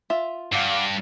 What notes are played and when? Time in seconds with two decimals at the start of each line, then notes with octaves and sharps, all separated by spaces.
0.10 F4 E5
0.53 G2 F5 F#5 D6